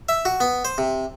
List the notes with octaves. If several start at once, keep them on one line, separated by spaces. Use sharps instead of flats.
E5
F#4
B3
C5
C3